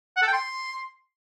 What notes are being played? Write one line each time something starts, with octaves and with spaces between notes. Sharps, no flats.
F#5
A4
G5
C6